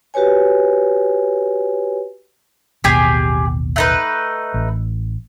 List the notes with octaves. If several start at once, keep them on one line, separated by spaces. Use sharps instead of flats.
F#4 G4 B4 C#5 G#5
A1 D#2 B2 G4 G#4
A3 D#4 B4
A1